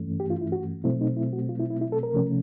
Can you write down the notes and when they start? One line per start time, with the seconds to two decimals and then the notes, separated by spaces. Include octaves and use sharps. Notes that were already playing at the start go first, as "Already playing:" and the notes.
Already playing: G2 E3 A3 C#4
0.20 G4
0.30 F4
0.41 E4
0.52 F#4
0.84 B2 F#3 A3 C4 E4
1.01 D#4
1.17 E4
1.33 F#4
1.49 F4
1.59 E4
1.71 E4
1.81 E4
1.92 A4
2.03 A#4
2.13 C3 F3 A3 C#4